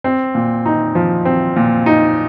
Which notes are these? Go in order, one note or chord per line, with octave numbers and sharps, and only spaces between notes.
C4
A#2
D#4
F3
C4
A#2
D#4